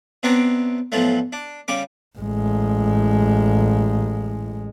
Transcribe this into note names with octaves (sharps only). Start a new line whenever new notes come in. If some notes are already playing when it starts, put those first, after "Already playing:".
C3 B3 C4 D4 C#5 A#5
B1 A2 F3 F#3 A3
D4
C#3 G3 C#4 D6
A1 G#3